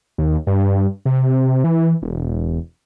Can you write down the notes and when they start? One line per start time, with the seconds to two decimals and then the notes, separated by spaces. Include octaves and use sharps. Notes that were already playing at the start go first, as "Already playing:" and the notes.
0.18 D#2
0.47 G2
1.06 C3
1.64 E3
2.02 E1